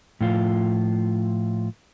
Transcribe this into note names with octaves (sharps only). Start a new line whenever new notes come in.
A2 F3 F4